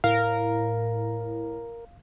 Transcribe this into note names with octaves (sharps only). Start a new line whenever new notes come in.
A2 A#4 F5